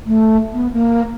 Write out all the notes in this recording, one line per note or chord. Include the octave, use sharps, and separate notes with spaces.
A3
B3
A#3